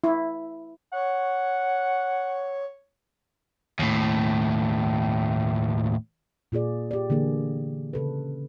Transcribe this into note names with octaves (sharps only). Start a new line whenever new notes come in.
E4
C#5 F#5
D#2 A2
A#2 F4 G#4 D5
G4 D5
D3 E3 A#3 G#4
C#3 A4 B4